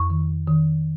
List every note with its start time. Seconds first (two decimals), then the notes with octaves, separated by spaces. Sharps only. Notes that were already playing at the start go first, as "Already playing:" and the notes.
Already playing: F2 C#6
0.10 D#3
0.48 D#3